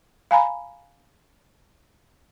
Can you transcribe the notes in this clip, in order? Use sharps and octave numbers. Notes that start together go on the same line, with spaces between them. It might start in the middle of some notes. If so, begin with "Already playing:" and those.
F5 G#5 A#5 B5